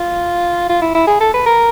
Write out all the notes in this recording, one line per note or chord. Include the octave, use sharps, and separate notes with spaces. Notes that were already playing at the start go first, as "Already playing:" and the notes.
Already playing: F4
F4
E4
E4
G#4
A4
B4
A#4